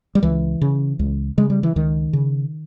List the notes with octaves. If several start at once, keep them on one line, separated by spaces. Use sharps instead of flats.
G3
C#2 E3
C#3
C#2
C#3 G#3
G3
E3
C#2 D#3
C#3